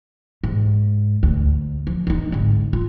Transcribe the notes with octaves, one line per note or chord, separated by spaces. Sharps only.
G#2
D2
F3
D4 D#4
G#1 D3
F4